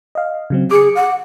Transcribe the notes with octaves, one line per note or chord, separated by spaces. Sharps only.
D#5 F5
C#3 F#3 C4
G#4 D6 C#7
F#5